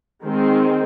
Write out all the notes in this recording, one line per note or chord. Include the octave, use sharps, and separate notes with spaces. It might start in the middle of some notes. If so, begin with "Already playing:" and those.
D#3 G#3 C4